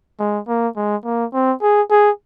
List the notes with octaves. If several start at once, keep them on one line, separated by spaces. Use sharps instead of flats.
G#3
A#3
G#3
A#3
C4
G#4
G#4